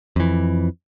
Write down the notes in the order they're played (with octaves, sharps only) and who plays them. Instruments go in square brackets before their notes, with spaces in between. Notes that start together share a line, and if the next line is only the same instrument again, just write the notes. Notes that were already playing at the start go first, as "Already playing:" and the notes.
[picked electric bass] F2 E3